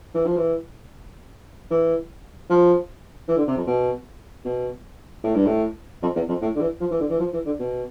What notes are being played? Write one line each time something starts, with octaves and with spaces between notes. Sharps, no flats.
E3
F3
E3
E3
F3
E3
D3
C3
F2
B2
B2
A2
G2
A2
F2
E2
F2
A2
D3
E3
F3
E3
D3
E3
F3
E3
D3
B2